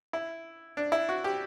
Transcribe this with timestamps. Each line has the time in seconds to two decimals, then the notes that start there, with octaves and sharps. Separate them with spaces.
0.13 E4
0.77 D4
0.92 E4
1.09 F#4
1.24 G4